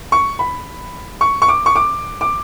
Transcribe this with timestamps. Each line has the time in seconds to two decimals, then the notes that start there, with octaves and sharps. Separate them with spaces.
0.12 C#6
0.39 B5
1.21 C#6
1.42 C#6
1.48 D6
1.66 C#6
1.76 D6
2.21 D6